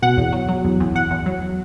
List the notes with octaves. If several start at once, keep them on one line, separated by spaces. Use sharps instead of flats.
B2 F#5
E2
F#3
F#3
E2
E2
E2 F#5
E2
F#3